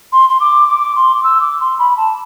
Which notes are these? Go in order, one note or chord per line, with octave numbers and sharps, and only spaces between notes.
C6
C6
D6
D6
C6
D6
E6
D6
C6
B5
A5